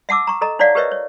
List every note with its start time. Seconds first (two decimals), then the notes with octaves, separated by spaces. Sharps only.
0.09 E5 F#5 A5 D6 E6
0.27 A#5 C#6
0.41 A4 D#5 A#5
0.59 D#4 E4 C#5 D5 F5 F#5
0.75 G4 A#4 B4 C#5 D#5 E5
0.91 C#5